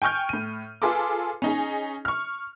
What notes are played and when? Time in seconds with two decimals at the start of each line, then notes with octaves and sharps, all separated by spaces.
0.02 G5 G#5 C#6 F6 G6
0.29 A2 D#7
0.82 F4 G#4 A4 B4 C6 D6
1.42 C#4 D#4 G#4
2.05 C#6 F6